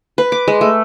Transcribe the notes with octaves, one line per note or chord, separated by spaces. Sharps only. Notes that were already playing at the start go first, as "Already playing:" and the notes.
B4
D6
G#3
A3